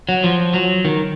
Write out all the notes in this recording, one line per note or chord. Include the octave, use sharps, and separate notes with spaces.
F#3
F3
F#3
D#3